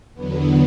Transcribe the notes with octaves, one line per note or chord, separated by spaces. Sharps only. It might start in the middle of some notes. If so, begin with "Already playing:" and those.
E2 D3 F#3 B3